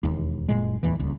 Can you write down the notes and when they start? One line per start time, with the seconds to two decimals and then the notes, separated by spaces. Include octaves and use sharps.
0.03 E1 D#2
0.49 F#1 A#2 G#3
0.83 D1 E2 E3
0.99 D#1 C#2